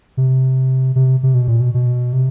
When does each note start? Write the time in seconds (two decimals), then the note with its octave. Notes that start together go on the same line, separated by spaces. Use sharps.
0.17 C3
0.96 C3
1.23 C3
1.35 B2
1.48 A#2
1.61 B2
1.74 B2
2.13 C3